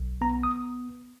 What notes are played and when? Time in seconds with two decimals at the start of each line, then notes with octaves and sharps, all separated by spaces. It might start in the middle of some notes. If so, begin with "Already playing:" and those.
Already playing: B1
0.21 B3 A#5
0.43 D#6